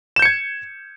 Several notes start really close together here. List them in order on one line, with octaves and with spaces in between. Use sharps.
E7 G6 C#7 G#6